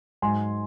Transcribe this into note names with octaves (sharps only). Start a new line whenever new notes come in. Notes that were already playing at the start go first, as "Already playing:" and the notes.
G#2 F#3 G#5 C6